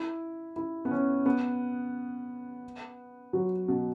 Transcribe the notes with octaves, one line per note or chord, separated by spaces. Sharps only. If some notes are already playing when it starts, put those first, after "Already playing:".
Already playing: E4
E4
B3
C#4
B3
F#3
B2